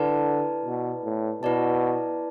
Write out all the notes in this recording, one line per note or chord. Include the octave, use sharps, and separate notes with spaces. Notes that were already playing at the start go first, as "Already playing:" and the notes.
Already playing: D3 E4 B4 D5 A5
B2
A2
B2 E4 B4 D5 A5